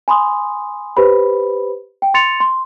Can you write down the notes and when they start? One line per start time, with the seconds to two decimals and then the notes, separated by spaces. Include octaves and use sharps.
0.08 G#5 B5 C6 D#6
0.97 G4 B4 C5 B5
2.02 G5
2.14 C6 A6 C#7 F7
2.40 C6